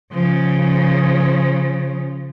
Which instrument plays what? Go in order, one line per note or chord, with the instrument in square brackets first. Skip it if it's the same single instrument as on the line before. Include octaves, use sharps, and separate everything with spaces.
[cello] C#3 F3